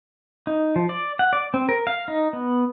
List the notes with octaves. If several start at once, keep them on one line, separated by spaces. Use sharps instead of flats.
D#4
F3
D5
F#5
D5
C4
A#4
F5
D#4
B3